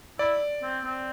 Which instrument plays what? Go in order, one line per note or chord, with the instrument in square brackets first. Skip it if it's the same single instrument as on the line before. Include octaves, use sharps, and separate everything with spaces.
[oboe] E4 [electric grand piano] D5
[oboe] C4
C4